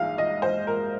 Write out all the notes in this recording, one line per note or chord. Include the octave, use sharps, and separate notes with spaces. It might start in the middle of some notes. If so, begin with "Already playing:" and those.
Already playing: A#1 G#2 F5
D#5
C5
A#4